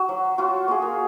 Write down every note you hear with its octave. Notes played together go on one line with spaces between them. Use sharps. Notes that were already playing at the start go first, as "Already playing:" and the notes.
Already playing: F#4
F#3
F4 F#4
A#3 G#4
A#4